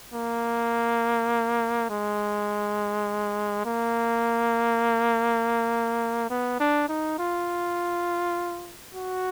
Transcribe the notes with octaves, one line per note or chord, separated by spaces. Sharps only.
A#3
G#3
A#3
B3
D4
D#4
F4
F#4